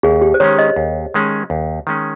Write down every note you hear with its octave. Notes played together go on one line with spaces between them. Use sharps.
D#2 G#4
G4
C5
D#3 G#3 C#4 C#5
D#5
D#2
D#3 G#3 C#4
D#2
D#3 G#3 C#4